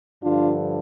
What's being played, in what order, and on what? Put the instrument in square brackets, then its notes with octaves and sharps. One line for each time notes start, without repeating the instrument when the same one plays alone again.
[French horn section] G2 D3 F3 D4 F4